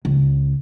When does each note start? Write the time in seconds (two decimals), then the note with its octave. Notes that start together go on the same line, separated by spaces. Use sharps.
0.05 C#2